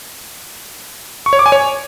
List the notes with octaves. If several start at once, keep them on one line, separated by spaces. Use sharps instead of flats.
C#6
C#5
D6
G#5
C#5